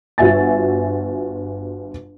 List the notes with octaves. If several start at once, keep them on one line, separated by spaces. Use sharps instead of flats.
G1 F4 F#4 E5 G#5 A6